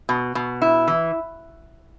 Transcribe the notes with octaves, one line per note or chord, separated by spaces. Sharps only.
B2
B2
E4
E3